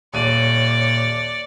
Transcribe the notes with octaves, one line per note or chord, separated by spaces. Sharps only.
D#1 C#5 D5 D#7